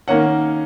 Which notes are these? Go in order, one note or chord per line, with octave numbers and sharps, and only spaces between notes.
D#3 A#3 C#4 F#5